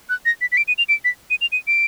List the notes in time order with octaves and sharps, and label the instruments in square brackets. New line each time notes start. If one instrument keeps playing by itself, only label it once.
[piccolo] F#6
A#6
B6
B6
D7
D#7
F7
D7
B6
D#7
F7
D#7
D7